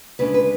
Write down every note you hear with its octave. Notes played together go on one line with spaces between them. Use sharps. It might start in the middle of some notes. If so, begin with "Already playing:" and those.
D2 C#3 G#3 D4 B4
B4